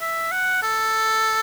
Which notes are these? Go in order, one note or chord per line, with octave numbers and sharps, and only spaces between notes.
E5
F#5
A4